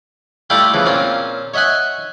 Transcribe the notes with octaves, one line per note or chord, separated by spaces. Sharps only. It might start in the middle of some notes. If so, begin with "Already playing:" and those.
G3 A3 E4 F4 G4 A4
C#3 E3 F3
A#2 C4 C#4 F4
C#5 D#5 E5 F#5 G#5